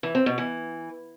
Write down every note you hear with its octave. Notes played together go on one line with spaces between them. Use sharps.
E3
C4
B2
E3